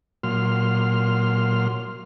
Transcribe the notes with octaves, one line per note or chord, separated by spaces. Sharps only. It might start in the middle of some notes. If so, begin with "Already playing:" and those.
A#2 F#3 C6 F6